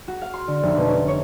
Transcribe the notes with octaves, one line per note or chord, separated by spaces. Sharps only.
F#4
F5
C6
D3
F1
B2
C#4
C#5